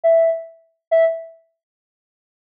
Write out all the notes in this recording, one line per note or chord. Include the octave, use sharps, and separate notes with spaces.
E5
E5